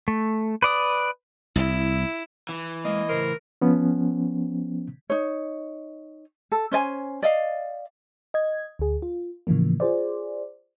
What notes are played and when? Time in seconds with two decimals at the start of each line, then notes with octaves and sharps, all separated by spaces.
0.08 A3
0.62 B4 D5 D#6
1.56 C2 E4
2.49 E3
2.85 G#3 A#3 D#5
3.09 A2 C#3 A#4 C5
3.61 F3 B3 C#4
5.10 D#4 C#5
6.52 A4
6.71 C#4 C5 D5 G#5
7.22 D5 D#5 F5
8.34 D#5 G#6
8.79 D2 G#4
9.02 F4
9.47 A2 C#3 E3 F3 A#3
9.80 F4 G#4 C5 D5